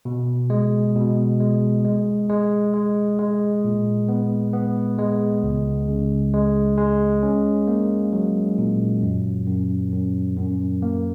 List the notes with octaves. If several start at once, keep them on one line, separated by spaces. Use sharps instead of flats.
B2
G#3
B2
G#3
G#3
G#3
G#3
G#3
A#2
B3
B3
G#3
C#2
C#3
G#3
G#3
C#4
A#3
F#3
A#2
F#2
F#2
F#2
F#2
A#3